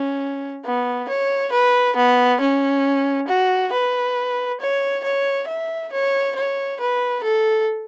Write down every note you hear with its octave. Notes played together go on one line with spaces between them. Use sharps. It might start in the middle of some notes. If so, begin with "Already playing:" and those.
Already playing: C#4
B3
C#5
B4
B3
C#4
F#4
B4
C#5
C#5
E5
C#5
C#5
B4
A4